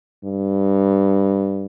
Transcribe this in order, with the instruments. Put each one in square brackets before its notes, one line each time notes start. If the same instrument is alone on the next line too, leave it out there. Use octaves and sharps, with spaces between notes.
[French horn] G2